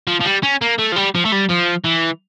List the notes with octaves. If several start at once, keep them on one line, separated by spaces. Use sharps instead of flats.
F3
F3
G3
C#4
A#3
A3
F3
G3
F3
A3
G3
F3
E3